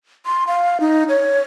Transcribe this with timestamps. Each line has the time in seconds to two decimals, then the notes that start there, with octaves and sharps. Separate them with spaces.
0.26 C6
0.47 F5
0.80 D#4
1.09 C#5